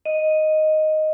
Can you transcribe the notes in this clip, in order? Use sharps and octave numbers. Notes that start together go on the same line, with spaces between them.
D#5